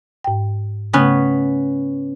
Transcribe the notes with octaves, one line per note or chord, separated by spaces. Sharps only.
G#2 G5
C#3 A3 B3 C#4 B4